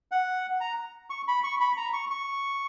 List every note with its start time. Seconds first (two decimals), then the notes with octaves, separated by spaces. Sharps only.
0.11 F#5
0.61 A#5
1.10 C#6
1.28 B5
1.44 C#6
1.60 B5
1.77 A#5
1.93 C#6
2.10 C#6